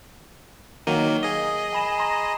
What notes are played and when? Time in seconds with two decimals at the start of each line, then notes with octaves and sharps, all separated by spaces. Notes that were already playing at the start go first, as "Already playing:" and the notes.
0.87 D#3 F#3 A#3 D#7 G7
1.23 G#4 D#5
1.73 G#5 B5 E7
1.98 A#5 C6 A#6